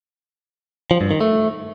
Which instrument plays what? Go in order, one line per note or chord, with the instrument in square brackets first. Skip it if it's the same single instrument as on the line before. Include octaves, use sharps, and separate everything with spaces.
[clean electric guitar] F3
G2
D#3
A3